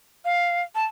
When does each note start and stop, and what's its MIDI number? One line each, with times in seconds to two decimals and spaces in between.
0.25 0.62 77
0.75 0.85 81